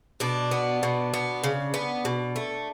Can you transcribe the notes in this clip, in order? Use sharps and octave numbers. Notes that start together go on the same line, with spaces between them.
B2 D4
B3
B2
B3
C#3
B3
B2
A3